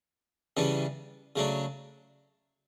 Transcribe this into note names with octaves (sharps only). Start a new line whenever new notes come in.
C#3 E3 G3 B3 D4
C#3 F#3 A3 D4